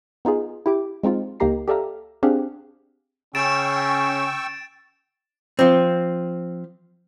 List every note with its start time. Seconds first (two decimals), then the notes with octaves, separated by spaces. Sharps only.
0.25 B3 D#4 F4 G#4
0.66 E4 G4 D6
1.03 G#3 C4 D#4 F4
1.40 C#2 A#3 D#4 G4 A#5 C7
1.68 G4 A4 D5 E5 F5 A#5
2.23 C4 D4 G4 G#4 F5 F#5
3.35 C#3 C#4 G5 C#6 E6 A6 D7 E7
5.59 F3 C4